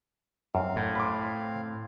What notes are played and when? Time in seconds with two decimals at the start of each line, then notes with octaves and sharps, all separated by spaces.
0.55 F#2 C4 F5
0.76 A2
0.95 B5 C6 D6